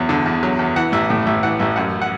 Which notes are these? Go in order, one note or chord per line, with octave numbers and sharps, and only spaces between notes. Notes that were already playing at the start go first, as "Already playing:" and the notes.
Already playing: E2 F#3
D3
E2
F#3
E2
E3 F#5
A1 E5
A2
A1 E5
E3 F#5
A1 E5
F#2 F#5
F#5